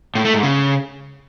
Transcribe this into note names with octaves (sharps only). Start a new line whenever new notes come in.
A2
A3
G#2
C#3